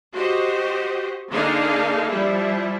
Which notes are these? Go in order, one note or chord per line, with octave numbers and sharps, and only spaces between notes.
F#4 G4 C5 D#5
D3 A#3 D4 D#4 G#4 F5
F3 G3 E4